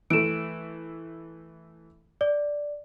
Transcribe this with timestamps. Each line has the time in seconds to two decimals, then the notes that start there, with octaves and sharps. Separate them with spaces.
0.10 E3 A3 D7 E7
2.21 D5